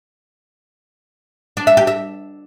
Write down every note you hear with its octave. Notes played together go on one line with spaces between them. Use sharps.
D4
E5
G4
E5